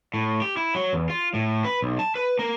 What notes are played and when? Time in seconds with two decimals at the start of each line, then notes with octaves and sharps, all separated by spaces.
0.14 A2
0.42 G4
0.57 E4
0.75 F#3
0.93 E2
1.10 F4
1.34 A2
1.64 B4
1.82 B1
1.99 A5
2.15 B4
2.39 A#3